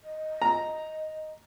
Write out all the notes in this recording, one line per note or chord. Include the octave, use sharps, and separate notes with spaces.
D#5
A#5